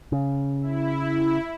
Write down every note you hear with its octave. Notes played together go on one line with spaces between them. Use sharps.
C#3
E4